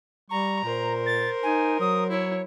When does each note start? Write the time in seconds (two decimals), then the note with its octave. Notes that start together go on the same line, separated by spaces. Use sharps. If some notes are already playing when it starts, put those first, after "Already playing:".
0.30 G3 A#5 C#6
0.64 A#2 A#4 C5
1.06 A6
1.43 D#4 G#5
1.80 F#3 D#6
2.10 E4 C#5